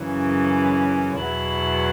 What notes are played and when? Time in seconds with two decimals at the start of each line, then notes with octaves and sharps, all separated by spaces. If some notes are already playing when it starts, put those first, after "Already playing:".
Already playing: F#2 C#3 E3 C#4
1.20 E2 B2 F#3 E4